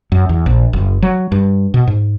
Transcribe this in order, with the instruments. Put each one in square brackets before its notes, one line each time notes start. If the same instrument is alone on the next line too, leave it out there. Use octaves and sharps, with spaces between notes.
[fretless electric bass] F#2
E2
A#1
F#1
F#3
G2
B2
G#2